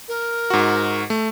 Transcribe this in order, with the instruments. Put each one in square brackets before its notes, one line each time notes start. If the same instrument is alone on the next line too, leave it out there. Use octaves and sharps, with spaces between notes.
[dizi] A#4
[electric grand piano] G#2 F#4
A3